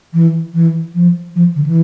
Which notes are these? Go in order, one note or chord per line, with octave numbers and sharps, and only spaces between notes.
E3
E3
F3
F3
D3
E3